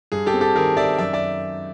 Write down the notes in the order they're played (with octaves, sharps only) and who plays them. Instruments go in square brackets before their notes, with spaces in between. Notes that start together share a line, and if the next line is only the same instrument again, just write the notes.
[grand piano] G2 G#4
G4 A4
C4
G4 A4
D#3 G#4 A#4
D#3 D5 E5
F#2 D5 E5
D5 E5